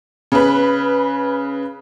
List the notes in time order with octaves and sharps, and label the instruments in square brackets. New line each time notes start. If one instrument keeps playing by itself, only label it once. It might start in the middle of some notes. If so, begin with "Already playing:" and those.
[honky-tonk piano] C#3 B4